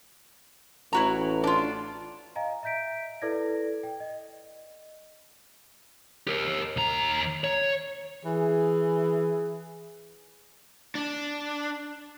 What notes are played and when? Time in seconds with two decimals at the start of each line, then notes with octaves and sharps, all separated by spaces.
0.93 A1 E4 F#4 A#5
1.44 D4 F4
2.36 D#5 F5 G#5 A#5
2.63 E5 A#5 G6 B6 D7
3.22 E4 A4 B4 D5 G#6 A#6
3.83 G5
4.00 D#5
6.27 G4 A#4
6.77 D#2 A#5
7.44 C#5
8.25 E3 G#4
10.95 D4